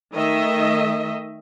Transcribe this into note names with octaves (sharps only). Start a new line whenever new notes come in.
D#3 A3 D#5 E5